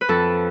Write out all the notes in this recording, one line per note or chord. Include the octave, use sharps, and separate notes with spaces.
B4
F2 A4